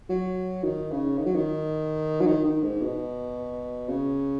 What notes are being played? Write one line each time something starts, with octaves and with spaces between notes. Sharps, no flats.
F#3
D#3
C#3
D#3
F#3
D#3
F#3
D#3
D#3
G#2
B2
C#3